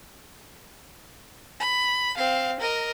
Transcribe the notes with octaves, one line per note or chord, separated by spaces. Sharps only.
B5
C4 F5
A#4 D#5